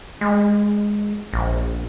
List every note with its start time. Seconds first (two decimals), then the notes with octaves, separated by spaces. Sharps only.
0.21 G#3
1.33 A#1